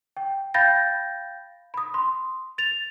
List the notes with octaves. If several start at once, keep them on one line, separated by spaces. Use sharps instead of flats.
G5
F5 G5 B5 G6 A6 A#6
B5 D#6
C6
A6 F7